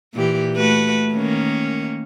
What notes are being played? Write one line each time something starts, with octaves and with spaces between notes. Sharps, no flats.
A#2 E3 G4
A3 F#4 B4
D#3 A#3 C#4